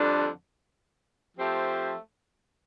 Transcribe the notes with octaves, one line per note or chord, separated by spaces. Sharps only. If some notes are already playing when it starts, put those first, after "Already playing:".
Already playing: F2 D3 G3 D4
F3 A3 C4 G4 C5